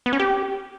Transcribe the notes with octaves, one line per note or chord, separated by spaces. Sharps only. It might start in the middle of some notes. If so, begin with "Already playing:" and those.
B3
C#4
G4